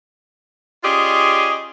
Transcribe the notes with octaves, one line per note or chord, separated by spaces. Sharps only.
C#4 F4 G4 G#4 D5 D#5